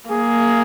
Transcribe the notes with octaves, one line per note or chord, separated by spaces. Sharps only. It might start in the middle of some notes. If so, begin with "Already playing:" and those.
A#3 G#4